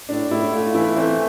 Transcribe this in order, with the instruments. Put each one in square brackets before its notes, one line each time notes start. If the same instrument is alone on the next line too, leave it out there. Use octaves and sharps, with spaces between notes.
[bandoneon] A2 [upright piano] D4
[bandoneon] A2 [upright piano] E4
[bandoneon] A3 [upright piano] F4
[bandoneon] E3 [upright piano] E4
[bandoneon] A3 [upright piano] C4